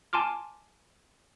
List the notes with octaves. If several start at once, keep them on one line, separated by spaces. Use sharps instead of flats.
G#5 A5 C6 D6 F6